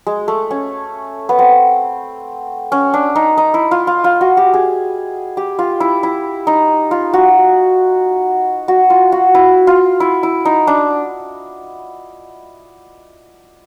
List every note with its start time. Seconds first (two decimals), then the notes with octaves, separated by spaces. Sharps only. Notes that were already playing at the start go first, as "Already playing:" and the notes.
0.07 G#3
0.28 A3
0.51 C#4
1.29 B3
1.39 C4
2.72 C#4
2.94 D4
3.16 D#4
3.38 D#4
3.54 E4
3.71 F4
3.87 F4
4.04 F4
4.21 F#4
4.37 G4
4.54 G#4
5.37 G4
5.59 F4
5.80 E4
6.03 E4
6.47 D#4
6.91 F4
7.13 F#4
8.68 F#4
8.90 F4
9.12 F#4
9.35 E4
9.67 F4
10.00 E4
10.23 E4
10.45 D#4
10.67 D4